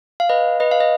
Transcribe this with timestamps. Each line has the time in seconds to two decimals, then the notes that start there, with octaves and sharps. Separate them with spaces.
0.20 F5
0.29 B4 D#5
0.60 B4 D#5
0.71 F5
0.80 D#5